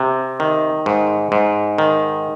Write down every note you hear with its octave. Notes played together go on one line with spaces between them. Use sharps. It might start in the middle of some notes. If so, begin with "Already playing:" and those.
Already playing: C3
D#3
G#2
G#2
D#3